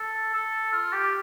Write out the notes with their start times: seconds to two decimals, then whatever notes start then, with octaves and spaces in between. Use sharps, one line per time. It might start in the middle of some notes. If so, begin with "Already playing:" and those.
Already playing: A4
0.34 A4
0.72 F4
0.92 G4